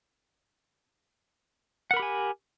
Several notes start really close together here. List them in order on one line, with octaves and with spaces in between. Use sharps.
F#5 A#4 B5 G4 G#5